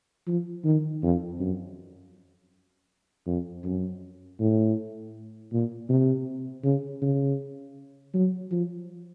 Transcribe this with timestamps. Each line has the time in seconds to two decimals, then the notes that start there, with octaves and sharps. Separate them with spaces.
0.28 F3
0.65 D#3
1.03 F2
1.40 F#2
3.27 F2
3.64 F#2
4.40 A2
5.52 A#2
5.90 C3
6.64 C#3
7.02 C#3
8.14 F#3
8.52 F3